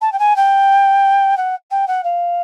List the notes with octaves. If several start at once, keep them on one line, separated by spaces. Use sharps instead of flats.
A5
G5
G#5
G5
F#5
G5
F#5
F5